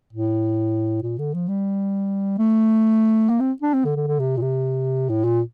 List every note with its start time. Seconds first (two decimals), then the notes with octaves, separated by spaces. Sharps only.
0.12 A2
1.03 A#2
1.18 D3
1.34 F3
1.48 G3
2.38 A3
3.29 A#3
3.40 C4
3.62 D4
3.73 C4
3.84 D3
3.96 D3
4.07 D3
4.19 C3
4.37 A#2
4.41 C3
5.09 A2
5.24 A#2